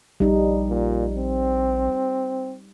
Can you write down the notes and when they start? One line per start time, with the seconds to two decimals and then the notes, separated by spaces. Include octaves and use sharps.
0.20 A#1 G3 D#4
0.69 A#2
1.16 C4